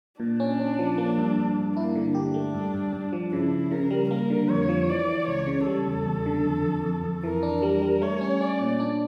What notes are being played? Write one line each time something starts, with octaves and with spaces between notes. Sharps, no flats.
A#2 D4
C#4
C#4
F3
A#3
G2
G2
G2
A#3 E4
D3
D4 G4
A3
G2
G2
G2
F3
C#3 E4
C#3
C#3 A#4
G3
A#3 A#4
D3
F2 C#5
F3
E3 D5
E3
C#2 C#5
C#3
G3 A4
E2
E2
D3
F2
F2
F2
F2
E3 A#4
D4
G3 A#4
G3
A3 C#5
C#4
C#4 D5
A#2
D4